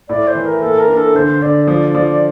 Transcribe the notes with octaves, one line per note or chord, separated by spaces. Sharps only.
A2 D5
C5
E3
A#4
A#3 A4
A#4
D4
A4
D3 C5
D3 D5
F3
F3